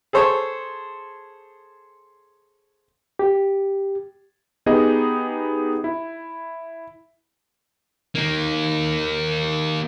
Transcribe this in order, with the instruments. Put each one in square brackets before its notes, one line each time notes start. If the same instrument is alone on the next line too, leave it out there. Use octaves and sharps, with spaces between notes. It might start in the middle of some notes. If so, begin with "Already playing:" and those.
[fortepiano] G#4 A4 C5 C#5
[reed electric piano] G4
[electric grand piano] B3 D#4 G4 G#4 D#5
E4
[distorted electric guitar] A#3 D#4